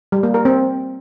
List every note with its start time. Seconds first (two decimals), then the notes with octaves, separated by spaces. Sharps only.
0.12 G3
0.23 A#3
0.34 A#4
0.45 C4